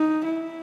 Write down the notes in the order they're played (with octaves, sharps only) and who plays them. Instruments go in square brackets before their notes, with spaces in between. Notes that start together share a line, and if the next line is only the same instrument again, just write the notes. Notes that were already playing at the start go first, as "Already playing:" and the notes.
Already playing: [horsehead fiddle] D#4
E4